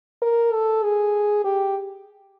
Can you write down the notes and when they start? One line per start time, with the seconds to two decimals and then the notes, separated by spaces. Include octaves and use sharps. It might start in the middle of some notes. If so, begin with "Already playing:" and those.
0.22 A#4
0.53 A4
0.83 G#4
1.44 G4